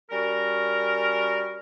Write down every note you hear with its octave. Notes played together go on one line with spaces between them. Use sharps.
G3 C#4 F#4 A#4